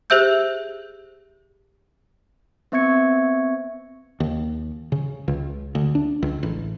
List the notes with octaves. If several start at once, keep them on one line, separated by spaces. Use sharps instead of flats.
G4 G#4 C5 E5 E6 G6
B3 C4 E5 C#6 G#6 C#7
D#2
C#3
C#2
D2
D4
C#2
A1